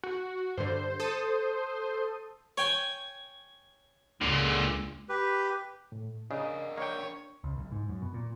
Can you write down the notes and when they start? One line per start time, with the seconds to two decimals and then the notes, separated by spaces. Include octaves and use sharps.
0.04 F#4
0.58 G2 D3 C5
1.00 A4 D#6
2.58 C#5 G5 G#5
4.21 C#2 A#2 D3
5.09 G4 B4
5.92 A2
6.31 C#3 D4 A#4 D#5
6.78 A#3 C#5 G5
7.44 C#2
7.58 B1
7.72 G#2
7.89 F#2
8.02 B2
8.14 A#2